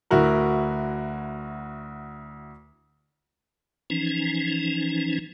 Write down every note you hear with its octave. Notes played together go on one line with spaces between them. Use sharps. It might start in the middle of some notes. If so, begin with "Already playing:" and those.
D2 E4 F#4 A#4
E3 F3 C#4 D#4